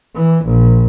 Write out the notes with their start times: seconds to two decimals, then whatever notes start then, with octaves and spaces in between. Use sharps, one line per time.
0.15 E3
0.45 A#1